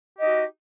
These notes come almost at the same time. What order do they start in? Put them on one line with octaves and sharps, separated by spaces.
G4 D#5 D#4 F#4